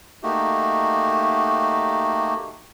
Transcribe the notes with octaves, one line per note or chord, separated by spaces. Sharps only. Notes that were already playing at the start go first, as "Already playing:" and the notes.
A3 A#3 D#4 F#4 G4